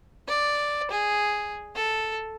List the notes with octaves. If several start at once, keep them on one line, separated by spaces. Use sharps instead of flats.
D5
G#4
A4